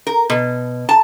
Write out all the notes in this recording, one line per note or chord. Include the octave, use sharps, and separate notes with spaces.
A#4
B2
A5